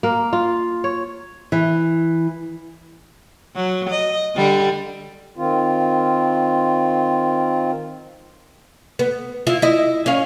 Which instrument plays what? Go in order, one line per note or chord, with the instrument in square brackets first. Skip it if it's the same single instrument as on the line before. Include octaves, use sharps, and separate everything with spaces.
[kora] A#3 A#4
F4
C#5
[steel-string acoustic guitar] E3
[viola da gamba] F#3
D#5
D3 G3
[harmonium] D#3 C4 F4
[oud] B3
E4 F4
E4 D#5
C#4 F5